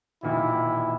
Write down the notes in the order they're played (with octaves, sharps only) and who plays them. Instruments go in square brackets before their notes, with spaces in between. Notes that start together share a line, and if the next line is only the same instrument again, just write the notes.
[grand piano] E1 A#2 D#3 [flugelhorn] E4